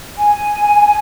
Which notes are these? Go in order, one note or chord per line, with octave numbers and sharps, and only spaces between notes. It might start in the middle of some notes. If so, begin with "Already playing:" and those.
G#5